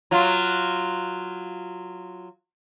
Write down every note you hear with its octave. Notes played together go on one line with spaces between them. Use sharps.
F#3 F4